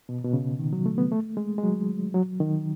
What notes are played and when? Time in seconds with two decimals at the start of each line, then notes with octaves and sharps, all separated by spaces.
0.09 B2
0.25 B2
0.33 C#3
0.59 D#3
0.73 F#3
0.86 A3
0.98 B3
1.11 A3
1.37 G#3
1.58 G#3
1.63 F#3
2.14 F#3
2.40 D#3